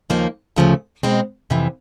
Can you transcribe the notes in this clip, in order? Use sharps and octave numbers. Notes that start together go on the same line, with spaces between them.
D#2 C#3 F3 A#3 D#4
D2 C#3 F3 A3
B2 G#3 C4
F2 C3 E3